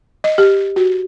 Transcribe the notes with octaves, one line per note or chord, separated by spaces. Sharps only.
D#5
G4
F#4